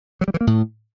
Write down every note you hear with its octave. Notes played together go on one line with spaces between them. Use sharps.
F#3
G3
E3
A#3
A2